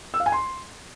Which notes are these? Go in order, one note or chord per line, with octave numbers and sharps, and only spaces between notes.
E6
F5
G#5
C6